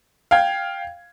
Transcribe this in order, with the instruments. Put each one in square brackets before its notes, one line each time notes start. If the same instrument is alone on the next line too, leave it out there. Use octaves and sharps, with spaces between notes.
[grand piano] F5 G5 G#6